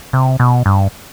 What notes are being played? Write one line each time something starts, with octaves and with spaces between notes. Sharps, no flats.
C3
B2
G2